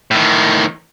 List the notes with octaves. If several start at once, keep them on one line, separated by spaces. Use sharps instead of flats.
A2 D#3